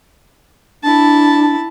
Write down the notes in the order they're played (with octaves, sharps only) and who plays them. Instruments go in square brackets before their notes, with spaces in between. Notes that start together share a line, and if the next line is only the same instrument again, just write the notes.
[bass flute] D4 [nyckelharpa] E4 A5